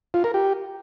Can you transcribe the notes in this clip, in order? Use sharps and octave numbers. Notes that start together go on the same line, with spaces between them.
F4
A#4
G4